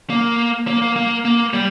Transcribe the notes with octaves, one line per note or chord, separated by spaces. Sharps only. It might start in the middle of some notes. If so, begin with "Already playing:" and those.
A#3
A#3
A#3
A#3
A#3
G3